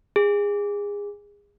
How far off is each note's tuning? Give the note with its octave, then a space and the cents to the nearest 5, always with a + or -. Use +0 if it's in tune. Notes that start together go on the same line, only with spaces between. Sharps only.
G#4 -25